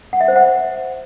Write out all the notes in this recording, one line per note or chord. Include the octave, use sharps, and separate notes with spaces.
F#5
E5
C5
F#5